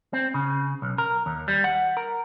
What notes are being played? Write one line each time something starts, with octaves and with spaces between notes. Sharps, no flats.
C4
C#3
B1
A#4
D#2
G3
F#5
A#4